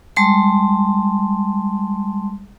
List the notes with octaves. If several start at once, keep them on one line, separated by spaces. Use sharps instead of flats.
G3 G#3 A5 C6